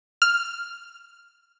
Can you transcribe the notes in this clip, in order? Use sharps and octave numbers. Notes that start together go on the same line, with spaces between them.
F6